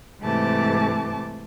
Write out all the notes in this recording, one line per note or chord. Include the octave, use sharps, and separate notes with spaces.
G#2 C3 E3 A3 A5 D6